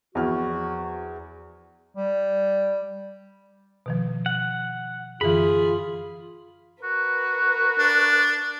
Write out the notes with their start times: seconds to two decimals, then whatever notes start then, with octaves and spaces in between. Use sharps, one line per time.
0.15 E2 F3 E4 F#4 F6
1.95 G3
3.86 B2 D#3 F3
4.26 F#5
5.21 F#2 D3 E3 F4 G#4 B5
6.83 F#4 A#4 B4
7.79 D4